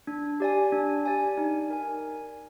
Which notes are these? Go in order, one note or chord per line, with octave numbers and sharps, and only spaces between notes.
D4
G4 D5 G#5
D4
G4 D5 G#5
D#4
A#4 D5 G#5